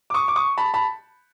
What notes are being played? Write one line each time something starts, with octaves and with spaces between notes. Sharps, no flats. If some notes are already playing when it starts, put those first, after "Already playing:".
D6
C#6 D#6
D6
C#6 D#6
A5 B5
A5 B5